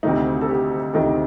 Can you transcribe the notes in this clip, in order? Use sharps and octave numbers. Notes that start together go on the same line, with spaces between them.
D2 C3 D#3 A3 D#4
A4
G4
D2 C3 D#3 A3 A4